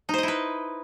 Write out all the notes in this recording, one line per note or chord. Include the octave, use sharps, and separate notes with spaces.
D#4 E4 B4 C5 D#5